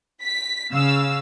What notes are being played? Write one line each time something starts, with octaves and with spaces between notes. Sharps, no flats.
B6
C#3 F5 E6